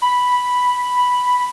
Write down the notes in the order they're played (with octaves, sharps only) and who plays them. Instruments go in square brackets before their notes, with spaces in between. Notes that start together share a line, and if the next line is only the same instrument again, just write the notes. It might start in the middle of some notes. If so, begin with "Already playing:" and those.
[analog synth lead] B5